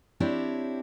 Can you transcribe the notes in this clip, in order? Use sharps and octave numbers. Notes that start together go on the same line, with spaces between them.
C4 D4 E4 G4 C#5